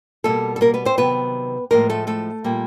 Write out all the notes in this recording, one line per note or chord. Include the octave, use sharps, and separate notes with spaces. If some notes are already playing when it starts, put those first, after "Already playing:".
B2 G3 A3 A#3 A4
A4
A#3 A#4
B3 B4
C4 C5
C3 D#3 F#3 B3 B4
A2 F3 G#3 A#3 A#4
A3 A4
A3 A4
A#2 G3 A#3